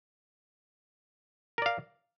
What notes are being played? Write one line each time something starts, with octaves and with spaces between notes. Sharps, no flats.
A#4 D5 F5